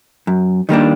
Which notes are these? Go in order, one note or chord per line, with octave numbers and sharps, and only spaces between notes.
F#2
D#3 G3 A#3 D4